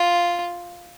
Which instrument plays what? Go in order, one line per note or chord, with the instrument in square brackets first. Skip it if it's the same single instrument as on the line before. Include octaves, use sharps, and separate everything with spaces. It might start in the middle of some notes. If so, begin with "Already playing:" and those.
Already playing: [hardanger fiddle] F4